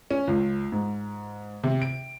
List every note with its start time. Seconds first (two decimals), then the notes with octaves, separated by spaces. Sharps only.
0.11 C#4
0.28 C#2
0.72 G#2
1.64 C3
1.82 D7